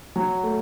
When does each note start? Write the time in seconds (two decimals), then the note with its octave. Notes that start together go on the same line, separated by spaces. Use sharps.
0.16 F#3
0.43 A3